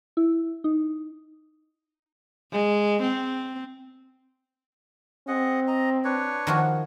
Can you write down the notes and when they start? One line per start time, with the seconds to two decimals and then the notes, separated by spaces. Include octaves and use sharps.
0.17 E4
0.64 D#4
2.52 G#3
3.02 C4
5.28 C4 G#4 D#5 F#5
5.67 D#5 A#5
6.04 D4 B4 C#5
6.47 D#3 F3 F#4